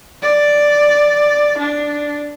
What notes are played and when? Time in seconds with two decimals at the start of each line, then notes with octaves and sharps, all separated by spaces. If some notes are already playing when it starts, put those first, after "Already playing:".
0.22 D5
1.58 D4